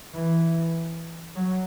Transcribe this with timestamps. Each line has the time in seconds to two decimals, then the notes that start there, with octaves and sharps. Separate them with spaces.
0.15 E3
1.36 F#3